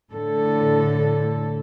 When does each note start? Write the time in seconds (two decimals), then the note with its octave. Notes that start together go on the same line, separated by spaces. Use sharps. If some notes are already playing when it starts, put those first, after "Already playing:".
0.12 A2 D3 A4